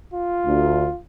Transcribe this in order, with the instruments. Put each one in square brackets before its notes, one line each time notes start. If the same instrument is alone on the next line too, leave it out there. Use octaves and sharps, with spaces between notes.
[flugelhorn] F4
[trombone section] D2